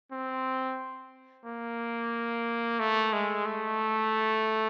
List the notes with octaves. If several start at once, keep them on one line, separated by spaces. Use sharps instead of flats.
C4
A#3
A3
G#3
A3